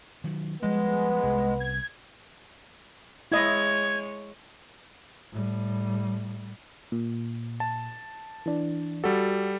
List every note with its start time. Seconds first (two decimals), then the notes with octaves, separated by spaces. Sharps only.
0.24 D#3 F#3
0.62 F3 G3 G#3 B3
1.23 C2
1.60 G#6
3.32 G#3 E4 C#5 D#5 G#6
5.32 A2 G3
6.92 A#2
7.60 A5
8.46 E3 D4
9.04 G3 F#4 A4